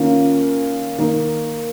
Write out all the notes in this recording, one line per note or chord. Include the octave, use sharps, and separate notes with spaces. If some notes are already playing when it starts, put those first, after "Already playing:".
Already playing: D#3 A#3 C#4 F4
D#3 A#3 D#4